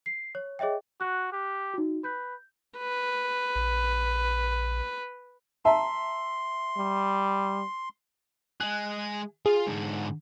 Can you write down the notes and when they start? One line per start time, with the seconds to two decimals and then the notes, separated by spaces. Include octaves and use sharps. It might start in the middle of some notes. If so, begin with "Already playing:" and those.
0.06 C7
0.35 C#5
0.59 G#4 C#5 D#5 E5 G5
1.01 F#4 F#6
1.32 G4
1.74 D#4 F#4
2.04 B4 G6
2.78 B4
3.55 A#1
5.65 E5 A5 A#5 C6
6.77 G3
8.60 G#3 G#4 F#6
9.46 F4 G#4 F5
9.67 G#2 D3